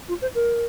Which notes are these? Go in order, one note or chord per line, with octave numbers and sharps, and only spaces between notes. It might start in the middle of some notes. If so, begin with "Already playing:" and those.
F4
C5
A#4